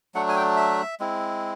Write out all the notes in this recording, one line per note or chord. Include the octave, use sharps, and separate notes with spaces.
F#3 A3 D4 F#5
G#5
G5
E5
G#3 C4 E4